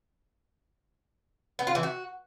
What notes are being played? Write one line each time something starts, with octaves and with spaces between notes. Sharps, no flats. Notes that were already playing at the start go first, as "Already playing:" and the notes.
B3
F4
E3
F#4